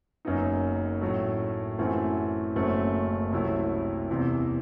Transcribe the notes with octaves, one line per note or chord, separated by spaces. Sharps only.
F#1 F#2 F#3 B3 D#4
A2 F#3 A3
F#2 E3 A3 C4 F#4
F#1 F#2 F#3 A3 C4
C2 C3 F#3 A3 E4
E2 C3 E3